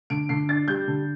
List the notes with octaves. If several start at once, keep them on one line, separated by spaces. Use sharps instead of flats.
D3 D7
D3 C7
D4 A6
G3 G6
D3